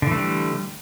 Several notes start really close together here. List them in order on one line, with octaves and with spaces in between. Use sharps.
D3 E3 A3 G3